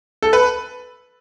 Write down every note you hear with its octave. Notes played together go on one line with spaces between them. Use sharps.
A4
B4